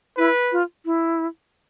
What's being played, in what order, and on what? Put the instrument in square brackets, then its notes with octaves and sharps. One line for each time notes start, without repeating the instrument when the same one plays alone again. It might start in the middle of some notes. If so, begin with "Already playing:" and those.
[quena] E4 [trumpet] B4
[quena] F4
E4